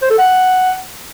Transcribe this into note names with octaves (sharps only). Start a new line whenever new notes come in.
C5
A4
F#5